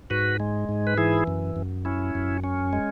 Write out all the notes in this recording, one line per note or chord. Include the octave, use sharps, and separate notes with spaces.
G#2 F#4 B4
G#3
G#2
B4
E3 E4 G#4
F#2
F#2
C#4 E4
F#2
C#4
G#3